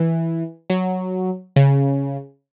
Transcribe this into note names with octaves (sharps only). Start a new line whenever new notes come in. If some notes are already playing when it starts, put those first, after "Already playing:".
Already playing: E3
F#3
C#3